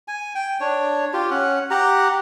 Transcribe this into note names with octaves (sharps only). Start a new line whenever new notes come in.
G#5
G5
D4 C#5
F4 G4
C#4 F#5
G4 F#5 A#5